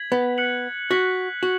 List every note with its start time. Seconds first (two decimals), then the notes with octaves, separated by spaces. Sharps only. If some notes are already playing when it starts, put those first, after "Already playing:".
Already playing: G#6 B6 F#7
0.12 B3
0.38 F#6 C#7 F#7
0.91 F#4 F#6 B6 F#7
1.43 F#4 F#7